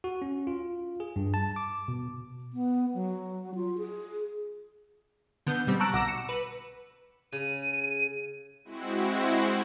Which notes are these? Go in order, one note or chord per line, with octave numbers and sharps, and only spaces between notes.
F#4
C#4
F4
G#4
G2
A5
D6
B2
B3
F#3
F4
G#4
D3 B3 G6
B2 G3 C4
A5 A#5 C#6 E6 F#6 D7
B1 F#5 D6 E6 A#6 E7
C#7 E7
B4
C#3 D#7
G#3 C4 E4 F#4